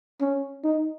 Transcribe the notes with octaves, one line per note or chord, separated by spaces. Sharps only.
C#4
D#4